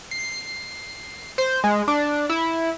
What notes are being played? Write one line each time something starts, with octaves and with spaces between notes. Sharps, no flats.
C7
C5
G#3
D4
E4